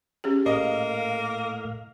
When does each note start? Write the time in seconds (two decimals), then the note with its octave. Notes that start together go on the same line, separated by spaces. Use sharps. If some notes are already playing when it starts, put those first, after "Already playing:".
0.24 C#4 G4 G#4
0.46 A2 A#3 D#5 F5